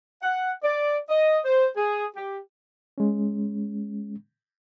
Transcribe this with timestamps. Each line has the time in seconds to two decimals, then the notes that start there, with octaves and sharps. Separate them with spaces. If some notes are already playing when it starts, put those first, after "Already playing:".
0.23 F#5
0.63 D5
1.09 D#5
1.44 C5
1.76 G#4
2.15 G4
2.98 G#3 C#4